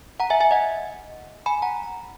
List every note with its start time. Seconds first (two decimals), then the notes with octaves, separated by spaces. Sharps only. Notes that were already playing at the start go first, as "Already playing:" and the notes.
0.20 F#5 A#5
0.30 E5 G#5
0.40 E5 G#5
0.51 D#5 F#5
1.46 G#5 B5
1.62 F#5 A#5